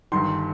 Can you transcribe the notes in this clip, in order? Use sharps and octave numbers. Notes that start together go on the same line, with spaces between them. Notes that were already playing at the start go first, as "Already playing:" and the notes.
G1 G2 D#3 C6